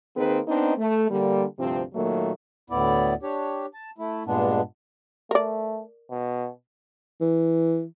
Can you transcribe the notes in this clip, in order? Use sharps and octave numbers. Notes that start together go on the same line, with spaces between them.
D#3 A#3 C4 D#4 G#4 B4
B3 C4 D4 D#4
A3
D3 G3 A#3
D2 G2 C3 F3 C4
A#2 D#3 F#3 A3 A#3
D2 A2 B3 E4 D5
D4 G4 C#5
A5
A3 E4
G2 A#2 G#3 B3 D4
A3 A#4 D5
B2
E3